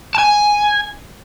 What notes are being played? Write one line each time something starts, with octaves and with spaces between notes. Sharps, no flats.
G#5 A5